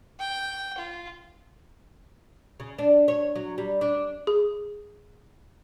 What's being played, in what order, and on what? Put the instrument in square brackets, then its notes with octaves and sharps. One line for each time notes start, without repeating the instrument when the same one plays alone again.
[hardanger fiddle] G5
F4
[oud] C#3
D4
C#5
F#3
G3
D4
[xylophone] G#4